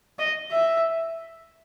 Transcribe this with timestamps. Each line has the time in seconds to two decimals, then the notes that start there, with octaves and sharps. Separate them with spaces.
0.19 D#5
0.51 E5